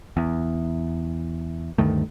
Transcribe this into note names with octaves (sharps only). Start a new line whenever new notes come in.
E2
D2 G2 D#3 A3